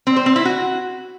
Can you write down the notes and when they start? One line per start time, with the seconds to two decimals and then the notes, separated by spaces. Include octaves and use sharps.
0.07 C4
0.16 C5
0.26 C4
0.36 E4
0.45 F#4